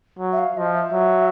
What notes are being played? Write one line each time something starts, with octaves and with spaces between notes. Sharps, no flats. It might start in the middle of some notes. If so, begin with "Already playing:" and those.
F#3
E5
F5
F3 D#5
E5
F#3